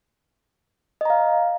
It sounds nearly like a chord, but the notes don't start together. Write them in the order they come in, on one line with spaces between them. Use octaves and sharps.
D#5 A#5 F5